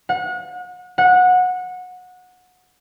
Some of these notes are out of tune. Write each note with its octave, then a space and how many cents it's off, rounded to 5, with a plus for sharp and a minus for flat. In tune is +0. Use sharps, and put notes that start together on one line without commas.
F#5 -35
F#5 -20